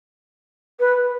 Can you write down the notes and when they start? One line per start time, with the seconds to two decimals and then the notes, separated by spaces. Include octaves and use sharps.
0.80 B4